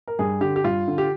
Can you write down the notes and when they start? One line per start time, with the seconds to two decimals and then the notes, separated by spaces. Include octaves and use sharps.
0.08 A#4
0.19 G2 G#4
0.41 D3 G4
0.56 G4
0.64 G2 F4
0.88 D3
0.98 G4